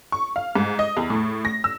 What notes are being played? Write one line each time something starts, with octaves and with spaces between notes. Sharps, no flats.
C#6
F5
G#2
D#5
E2
A2
A#6
E6